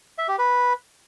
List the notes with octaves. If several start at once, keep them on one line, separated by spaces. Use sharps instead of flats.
E5
G4
B4